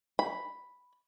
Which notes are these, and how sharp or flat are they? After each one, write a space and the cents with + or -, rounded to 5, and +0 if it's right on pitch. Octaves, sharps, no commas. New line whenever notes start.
B5 +0